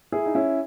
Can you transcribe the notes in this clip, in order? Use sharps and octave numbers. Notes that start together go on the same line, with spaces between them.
E4 G#4
D#4
C#4 E4